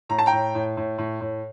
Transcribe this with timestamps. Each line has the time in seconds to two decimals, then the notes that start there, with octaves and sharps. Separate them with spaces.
0.09 A2 A#5
0.19 A5
0.26 G5 A#5
0.32 A2
0.55 A2
0.77 A2
0.98 A2
1.21 A2